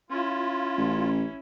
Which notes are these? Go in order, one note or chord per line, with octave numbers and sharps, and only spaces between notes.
C#4 E4 F4
A1